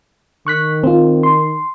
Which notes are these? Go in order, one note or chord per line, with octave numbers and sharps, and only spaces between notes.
D#3 C#6 F#6 B6
C4 F4
C6